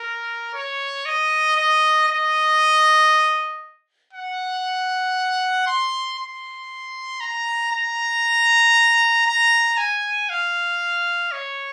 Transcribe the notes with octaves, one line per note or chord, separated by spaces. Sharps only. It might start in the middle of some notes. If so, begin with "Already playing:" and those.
Already playing: A#4
C#5
D#5
D#5
D#5
F#5
C6
C6
A#5
A#5
A#5
G#5
F5
C#5